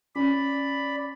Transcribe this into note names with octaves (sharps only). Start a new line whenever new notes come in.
C#4 D5 B5